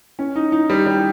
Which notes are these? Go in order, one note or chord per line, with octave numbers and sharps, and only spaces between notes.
C#4
D#4
D#4
G3
G3